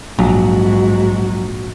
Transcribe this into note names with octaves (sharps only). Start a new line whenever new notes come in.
A#1 G#2 F#3 F#4